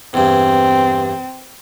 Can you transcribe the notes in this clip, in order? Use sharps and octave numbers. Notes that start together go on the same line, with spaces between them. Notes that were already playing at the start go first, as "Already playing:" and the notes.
E2 G2 C4